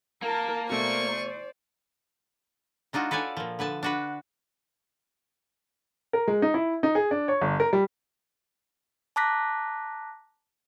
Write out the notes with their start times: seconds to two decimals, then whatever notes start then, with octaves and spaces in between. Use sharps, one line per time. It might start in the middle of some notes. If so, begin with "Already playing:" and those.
0.22 A#3 A#4 A5
0.70 B2 A3 C5 D5 G#5 C#6
2.93 G#3 D4 D#4 F4 F#4
3.11 A4 B4 C#5 D5 G#5
3.37 A#2 F3
3.59 D3 B4 G#5 A5
3.83 D4 F#4 B4
6.13 A#4
6.28 G#3
6.42 D#4
6.54 E4
6.83 D#4
6.95 G#4
7.11 D4
7.28 C#5
7.42 G1
7.60 A#4
7.73 G3
9.16 A5 A#5 D6 F#6 A#6 B6